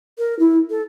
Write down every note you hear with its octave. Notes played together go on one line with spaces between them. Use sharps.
A#4
E4
A4